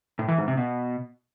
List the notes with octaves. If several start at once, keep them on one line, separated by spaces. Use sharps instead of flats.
A2
E3
G#2
C3
B2